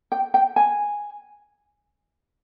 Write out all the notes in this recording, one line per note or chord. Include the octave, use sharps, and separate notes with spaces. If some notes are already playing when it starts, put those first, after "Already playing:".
G5
G5
G#5